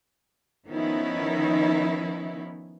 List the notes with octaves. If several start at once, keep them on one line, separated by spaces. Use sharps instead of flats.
D#3 F3 B3 C#4 D#4 E4